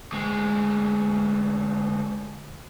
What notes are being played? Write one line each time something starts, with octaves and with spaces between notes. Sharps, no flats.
D2 G#3